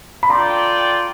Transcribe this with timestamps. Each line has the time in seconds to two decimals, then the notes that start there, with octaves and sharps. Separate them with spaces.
0.23 B5
0.29 F4 A4 D5 G5 A#5 C6